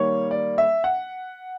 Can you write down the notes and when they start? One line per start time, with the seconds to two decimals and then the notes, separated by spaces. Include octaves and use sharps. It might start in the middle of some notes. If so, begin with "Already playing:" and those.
Already playing: D#3 G3 A#3 C#5
0.31 D5
0.58 E5
0.84 F#5